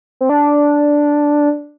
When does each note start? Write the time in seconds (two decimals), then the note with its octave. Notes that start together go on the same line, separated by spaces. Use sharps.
0.21 C4
0.29 D4